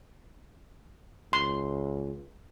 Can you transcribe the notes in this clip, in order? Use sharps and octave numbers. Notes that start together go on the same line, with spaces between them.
C#2 C6